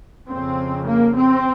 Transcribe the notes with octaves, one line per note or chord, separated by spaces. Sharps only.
F2 C#3 C4
A#3
C4